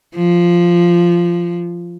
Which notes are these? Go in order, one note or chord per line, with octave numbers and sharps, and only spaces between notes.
F3